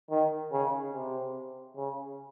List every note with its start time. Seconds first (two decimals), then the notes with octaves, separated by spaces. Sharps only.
0.10 D#3
0.52 C#3
0.93 C3
1.76 C#3